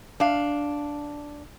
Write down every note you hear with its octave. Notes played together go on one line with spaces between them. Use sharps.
D4 F5